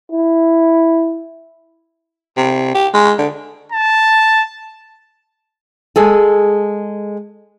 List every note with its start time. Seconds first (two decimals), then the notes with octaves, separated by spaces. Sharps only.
0.12 E4
2.37 C3
2.74 G4
2.94 G#3
3.19 D3
3.72 A5
5.96 G#3 G#4 A4